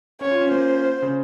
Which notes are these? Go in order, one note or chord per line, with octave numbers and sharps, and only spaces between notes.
C#4 C#5
F4
C#4
A#3 C5
C#3